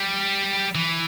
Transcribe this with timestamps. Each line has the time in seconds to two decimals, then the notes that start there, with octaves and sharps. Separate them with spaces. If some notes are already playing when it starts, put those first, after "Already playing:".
Already playing: G3
0.75 E3